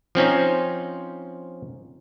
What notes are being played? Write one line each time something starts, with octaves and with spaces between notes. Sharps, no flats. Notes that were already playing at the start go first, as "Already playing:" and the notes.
F3 C4 C#4 D#4